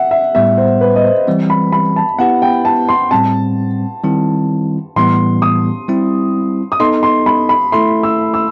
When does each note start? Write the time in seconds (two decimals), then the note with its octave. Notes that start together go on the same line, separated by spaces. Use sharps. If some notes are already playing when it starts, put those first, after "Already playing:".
Already playing: E5 F#5
0.11 E5
0.35 A2 G3 B3 E5
0.58 C5
0.81 B4
0.96 D#5
1.04 C5
1.28 E3 G3 C4
1.50 B5
1.72 B5
1.96 A5
2.19 B3 E4 G4 B4 F#5
2.42 G5
2.65 A5
2.89 C6
3.11 A2 G3 C4 A5
4.04 D#3 G3 C4 E4
4.96 A2 E3 G3 B3 C6
5.42 D#6
5.88 G3 C4 E4
6.72 D#6
6.80 B3 D#4 A4 D#5 C6
7.03 C6
7.26 B5
7.49 B5
7.72 A3 E4 A4 E5 C6
8.03 E6
8.34 E6